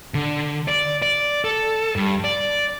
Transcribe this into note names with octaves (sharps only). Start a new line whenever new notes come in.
D3
D5
D5
A4
G2
D5